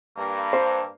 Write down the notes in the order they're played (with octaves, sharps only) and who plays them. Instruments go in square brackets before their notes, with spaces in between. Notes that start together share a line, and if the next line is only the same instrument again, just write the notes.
[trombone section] G2 [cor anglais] A#3
[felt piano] C5